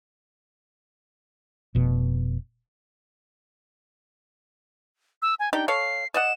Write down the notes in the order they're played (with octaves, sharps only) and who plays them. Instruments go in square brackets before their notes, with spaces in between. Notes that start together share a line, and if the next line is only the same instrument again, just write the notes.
[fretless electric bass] F1 B2
[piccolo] E6
G#5
[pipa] D4 D#4 G4 [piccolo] G5
[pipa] A4 C#5 F5 [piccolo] C7
[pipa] D5 D#5 F#5 [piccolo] E7